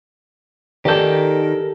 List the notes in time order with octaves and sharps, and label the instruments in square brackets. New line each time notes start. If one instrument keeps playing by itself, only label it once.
[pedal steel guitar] D#3 D#4 [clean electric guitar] G4 A4 [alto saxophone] A#4 [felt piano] D5 G6